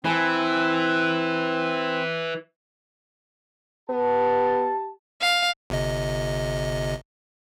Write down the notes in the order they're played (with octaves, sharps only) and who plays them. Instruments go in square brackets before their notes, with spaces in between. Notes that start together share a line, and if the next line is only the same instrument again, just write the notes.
[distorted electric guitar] E3 [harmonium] C4 [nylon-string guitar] E4 G#5 A5
[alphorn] B3 [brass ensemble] G4 A5
[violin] F5
[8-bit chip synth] G1 C3 D#5